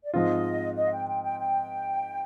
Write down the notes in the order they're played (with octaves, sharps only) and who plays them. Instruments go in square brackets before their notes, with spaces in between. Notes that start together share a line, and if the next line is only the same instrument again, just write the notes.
[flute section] D5
[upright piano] G#2 F3 C4 F4 [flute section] D#5
[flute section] D#5
F5
G5
G5
G5
G5